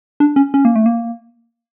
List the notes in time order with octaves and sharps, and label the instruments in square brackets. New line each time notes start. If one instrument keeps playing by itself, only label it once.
[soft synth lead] D4
C#4
C#4
A#3
A3
A#3